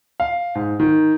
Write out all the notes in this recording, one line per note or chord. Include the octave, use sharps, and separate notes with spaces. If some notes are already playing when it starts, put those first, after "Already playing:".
F5
G#2
D#3